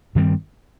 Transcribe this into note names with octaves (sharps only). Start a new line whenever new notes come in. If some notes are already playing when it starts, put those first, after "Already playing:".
G2 D#3 G3 C4